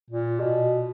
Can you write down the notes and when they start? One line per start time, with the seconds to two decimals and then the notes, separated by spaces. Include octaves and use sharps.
0.10 A#2
0.39 B2